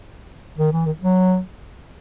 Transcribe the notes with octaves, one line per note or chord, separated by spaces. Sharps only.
D#3
E3
D#3
F#3